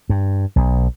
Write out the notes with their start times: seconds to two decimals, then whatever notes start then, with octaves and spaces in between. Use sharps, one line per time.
0.09 G2
0.56 B1